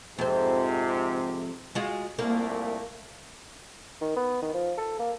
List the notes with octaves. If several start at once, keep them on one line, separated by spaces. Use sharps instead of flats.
F2 G#2 C3 C5
G#3 F4 F#4
C2 A#2 A3 A#3
D#3
B3
D#3
F3
A4
A#3